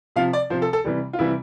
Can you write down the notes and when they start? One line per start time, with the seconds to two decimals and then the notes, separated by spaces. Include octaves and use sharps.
0.16 C3 F3 F5
0.33 D5
0.50 C3 F3 C5
0.62 A4
0.73 A4
0.85 C3 E3 G3
1.13 F4
1.19 C3 E3 G3 E4